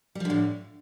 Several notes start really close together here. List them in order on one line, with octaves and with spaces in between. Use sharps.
G3 F3 D3 A2